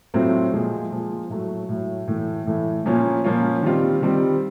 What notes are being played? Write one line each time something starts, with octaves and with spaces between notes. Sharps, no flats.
A2 F#3 A3 C4 F4
A#2 F3 G#3
A#2 F3 G#3
A2 F#3 A3
A2 F#3 A3
A2 E3 A3
A2 E3 A3
A#2 F3 A#3 C#4 F4
A#2 F3 A#3 C#4 F4
D#3 G3 C4 F4
D#3 G3 C4 F4